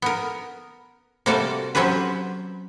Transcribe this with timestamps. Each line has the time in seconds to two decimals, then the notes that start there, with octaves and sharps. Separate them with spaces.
0.02 B3 A#4
1.26 C3 G3 A#3 F#4 A4 D5
1.75 F#3 C4 C#4 G4 B4